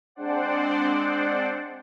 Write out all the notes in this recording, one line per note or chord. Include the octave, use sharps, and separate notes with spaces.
G#3 C4 D4 C5 D5 F#5